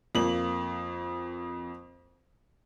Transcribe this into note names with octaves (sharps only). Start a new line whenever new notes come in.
F2 A#3 F#7